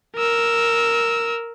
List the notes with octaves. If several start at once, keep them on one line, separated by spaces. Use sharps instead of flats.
A#4 E6